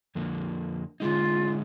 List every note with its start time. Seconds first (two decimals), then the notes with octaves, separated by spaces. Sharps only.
0.15 F2 D3 F3 A#3
1.00 D3 G#3 D#4 F4